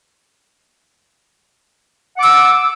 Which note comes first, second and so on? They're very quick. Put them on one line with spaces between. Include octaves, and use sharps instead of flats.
F#5 D6 E6